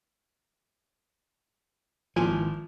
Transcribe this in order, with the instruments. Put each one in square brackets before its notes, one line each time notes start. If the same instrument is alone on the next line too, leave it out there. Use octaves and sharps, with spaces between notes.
[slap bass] G#1 E3 [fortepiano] A#2 F3 G#5